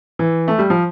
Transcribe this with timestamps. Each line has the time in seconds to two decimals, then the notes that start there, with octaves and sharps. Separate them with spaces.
0.19 E3
0.48 A3
0.58 G3
0.70 F3